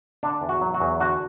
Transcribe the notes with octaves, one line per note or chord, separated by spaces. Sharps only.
D3 D4
E2
F#4
F#3
F#4
E2
D3 F#4